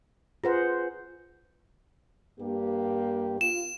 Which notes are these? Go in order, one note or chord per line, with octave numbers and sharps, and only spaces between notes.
F4 G#4 B4 C5 F#5
G2 A#3 G4
F4 E7